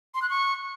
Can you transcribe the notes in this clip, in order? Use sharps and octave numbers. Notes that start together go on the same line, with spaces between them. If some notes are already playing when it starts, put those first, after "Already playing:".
C6
F#6
C#6